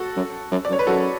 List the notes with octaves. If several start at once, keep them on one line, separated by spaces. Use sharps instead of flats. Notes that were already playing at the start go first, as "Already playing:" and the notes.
Already playing: F#4 A4
F#2
F#2
D5
F#2
C#5
B4
F#2 F#4 A4